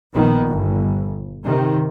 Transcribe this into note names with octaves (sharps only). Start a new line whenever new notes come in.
A#1 A#2 D#3 B3
G1
C3 D#3